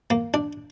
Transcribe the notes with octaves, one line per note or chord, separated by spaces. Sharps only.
A#3
D4